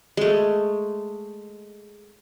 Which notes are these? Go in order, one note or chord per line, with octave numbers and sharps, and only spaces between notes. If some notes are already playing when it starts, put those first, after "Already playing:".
G#3 A3